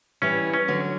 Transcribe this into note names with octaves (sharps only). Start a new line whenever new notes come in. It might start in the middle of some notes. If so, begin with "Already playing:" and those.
E3 G3 C#4
C#4
D3 F#3